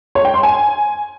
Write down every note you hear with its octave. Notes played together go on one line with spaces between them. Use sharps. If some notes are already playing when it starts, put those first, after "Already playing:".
C#5
G5
C6
G#5